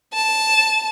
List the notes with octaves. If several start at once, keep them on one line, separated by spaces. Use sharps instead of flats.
A5